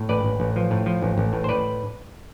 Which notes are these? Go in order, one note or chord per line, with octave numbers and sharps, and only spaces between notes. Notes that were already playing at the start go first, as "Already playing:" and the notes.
Already playing: A2
A1 B4 D5
A1
A1
F3
A2
F3
A1
A1
A2
C5
A2 B4 D5